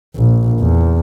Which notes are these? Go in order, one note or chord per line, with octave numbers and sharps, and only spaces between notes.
A#1
E2